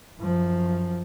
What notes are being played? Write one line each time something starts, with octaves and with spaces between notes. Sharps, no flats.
F#2 F3